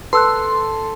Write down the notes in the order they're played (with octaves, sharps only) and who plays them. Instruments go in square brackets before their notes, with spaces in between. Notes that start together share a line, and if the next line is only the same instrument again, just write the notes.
[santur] A4 [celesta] B4 E6 F#6 [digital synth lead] C6